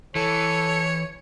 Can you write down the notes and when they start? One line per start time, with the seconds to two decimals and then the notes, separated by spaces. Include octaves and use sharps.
0.15 E3 A4 C#5